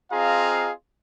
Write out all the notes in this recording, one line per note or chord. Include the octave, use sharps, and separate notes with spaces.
C4 F4 G#4 D#5 F5 A#5